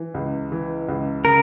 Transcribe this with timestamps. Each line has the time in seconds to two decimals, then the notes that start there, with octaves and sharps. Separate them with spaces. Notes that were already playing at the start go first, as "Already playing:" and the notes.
Already playing: E3
0.14 C#2
0.52 E3
0.88 C#2
1.25 C#3 A#4